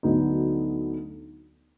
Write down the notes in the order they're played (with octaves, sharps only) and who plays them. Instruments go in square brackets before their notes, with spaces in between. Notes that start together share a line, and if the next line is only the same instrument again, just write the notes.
[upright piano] D2 D3 F#3 B3 D#4